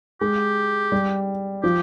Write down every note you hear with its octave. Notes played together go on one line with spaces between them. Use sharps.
G#3 G4
G3
F3 G4